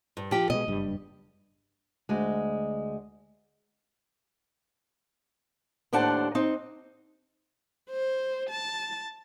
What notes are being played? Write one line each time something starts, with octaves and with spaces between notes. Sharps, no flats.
G2
F3 G4
B2 G#3 D#5
F#1 G2 G3
D2 G#3
D#2 A2 D4 C5 F#5 A5
C4 D#4
C5
A5